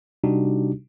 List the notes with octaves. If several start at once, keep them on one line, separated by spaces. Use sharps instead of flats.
C3 G3 D4 D#4 F#4 G4